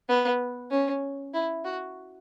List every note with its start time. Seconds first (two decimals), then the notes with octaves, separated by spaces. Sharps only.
0.09 B3
0.71 C#4
1.34 E4
1.65 F#4